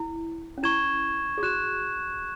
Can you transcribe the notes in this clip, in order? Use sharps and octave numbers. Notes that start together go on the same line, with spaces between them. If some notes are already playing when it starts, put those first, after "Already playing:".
Already playing: E4
C#4
E4 C#6 G#6 E7
G#4
F#4 F#6 E7